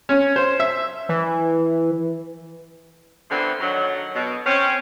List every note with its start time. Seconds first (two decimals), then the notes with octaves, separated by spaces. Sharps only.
0.09 C#4
0.36 C5
0.60 E5
1.09 E3
3.31 D3 E3 F3 B3 C4
3.60 D3 D#3 F#3
4.15 B2
4.46 C4 C#4